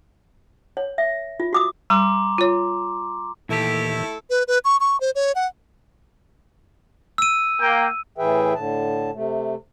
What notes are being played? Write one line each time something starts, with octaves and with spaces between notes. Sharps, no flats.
C#5
E5
F4
F#4 D6 D#6
G3 A#5 C6 D6
F4 C#5
D#2 A#2 E3 A3 E4 G4 A4
B4
B4
C#6
C#6
C5
C#5
F#5
E6 D#7
A#3 G5
A2 E3 G#4 B4 E5 G5
A2 D3 A5
C3 A3